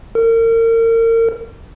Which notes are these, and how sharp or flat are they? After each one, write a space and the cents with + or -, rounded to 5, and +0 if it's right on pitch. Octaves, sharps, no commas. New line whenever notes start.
A#4 -35